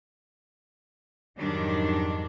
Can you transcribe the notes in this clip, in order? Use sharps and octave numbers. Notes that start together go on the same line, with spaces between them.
F2 G#2 D#3 F#3 G3 D4